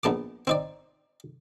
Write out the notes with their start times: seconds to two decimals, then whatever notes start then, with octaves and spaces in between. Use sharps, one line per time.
0.03 A#1 B3 A5 D6
0.47 C4 D#4 D5